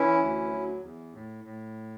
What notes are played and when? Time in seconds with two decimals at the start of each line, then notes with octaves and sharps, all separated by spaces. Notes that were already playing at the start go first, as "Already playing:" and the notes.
Already playing: E3 C#4 E4
0.20 D2
0.51 F#3
0.83 E2
1.13 A2
1.44 A2